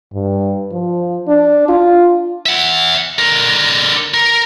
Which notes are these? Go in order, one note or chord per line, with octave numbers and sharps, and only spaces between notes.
G2
F3
D4
F4
E5 F#5
D3 A#4
A#4